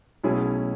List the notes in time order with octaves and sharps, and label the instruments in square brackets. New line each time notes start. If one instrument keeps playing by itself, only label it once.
[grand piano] B1 B2 A3 C#4 E4 G#4